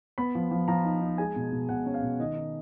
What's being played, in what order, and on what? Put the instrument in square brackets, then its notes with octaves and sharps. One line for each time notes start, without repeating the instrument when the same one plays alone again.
[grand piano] B3 B5
F3
F3
F3 A#5
D#4
D#4
G#3 G#5
B2
B2
B2 F#5
C#4
F5
B2
D#3 D#5
D#4